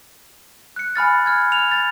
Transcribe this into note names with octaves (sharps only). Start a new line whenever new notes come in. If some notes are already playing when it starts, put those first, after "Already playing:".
F#6 C#7
G#5 B5 F6 A6
F6 G#6
F7
A6